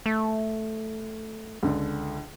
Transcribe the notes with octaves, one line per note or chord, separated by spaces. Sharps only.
A3
C#2 D3